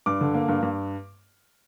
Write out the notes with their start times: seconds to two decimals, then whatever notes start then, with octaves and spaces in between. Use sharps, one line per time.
0.06 G2 D6
0.21 D3
0.34 A#3
0.48 G2
0.62 G2